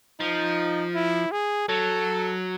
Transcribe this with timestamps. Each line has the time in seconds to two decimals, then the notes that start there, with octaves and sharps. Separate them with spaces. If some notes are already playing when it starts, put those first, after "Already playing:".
0.20 F3 D#4
0.95 E4
1.32 G#4
1.68 F#3 A4